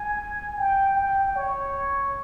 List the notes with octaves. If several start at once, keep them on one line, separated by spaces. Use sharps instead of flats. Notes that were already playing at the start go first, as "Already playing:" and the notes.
Already playing: G#5
G5
G5
C#5